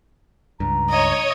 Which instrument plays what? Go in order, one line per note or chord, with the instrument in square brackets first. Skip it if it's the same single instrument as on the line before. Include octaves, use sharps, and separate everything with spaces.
[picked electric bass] C#2 G2 [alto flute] A#5
[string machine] C#5 [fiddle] D#5